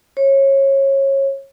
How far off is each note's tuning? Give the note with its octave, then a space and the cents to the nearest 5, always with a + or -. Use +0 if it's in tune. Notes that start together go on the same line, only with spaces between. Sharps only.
C#5 -25